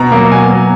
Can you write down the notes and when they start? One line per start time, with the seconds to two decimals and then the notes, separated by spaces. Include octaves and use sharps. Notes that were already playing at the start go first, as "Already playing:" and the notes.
Already playing: B2 A#5
0.12 F#3 A#3
0.31 B2 G#5
0.50 F#3 A#3